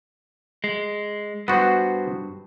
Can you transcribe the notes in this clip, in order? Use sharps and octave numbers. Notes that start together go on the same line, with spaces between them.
G#3
G2 B3 F#4 C5